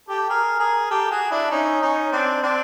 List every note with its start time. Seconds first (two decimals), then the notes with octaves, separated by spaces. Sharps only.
0.09 G4 A4
0.29 G#4 A#4
0.59 G#4 A#4
0.91 G4 A4
1.11 F#4 G#4
1.31 D4 E4
1.51 C#4 D#4
1.82 C#4 D#4
2.12 C4 D4
2.42 C4 D4